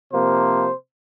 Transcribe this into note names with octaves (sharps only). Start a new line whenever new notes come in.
C3 F3 A#3 C5